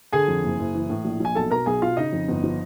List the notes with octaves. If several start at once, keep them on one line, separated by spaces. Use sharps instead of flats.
D3 G#4 G#5
F2
F#1
F#1
E3
A2
A#1
A#1 G#5
B1 A4 A5
B2 A#4 A#5
B1 G#4 G#5
B2 F4 F5
C#3 D#4 D#5
F2
G1
F3